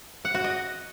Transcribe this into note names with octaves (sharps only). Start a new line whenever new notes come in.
F#5
F#4
D#5